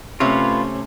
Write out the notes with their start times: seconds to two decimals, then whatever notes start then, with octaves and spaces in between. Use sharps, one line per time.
0.20 C3 A3 C#4 F4 B4 C#5